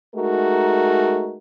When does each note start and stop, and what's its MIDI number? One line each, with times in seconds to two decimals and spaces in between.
0.15 1.38 56
0.15 1.38 57
0.15 1.38 63
0.15 1.38 66
0.15 1.38 70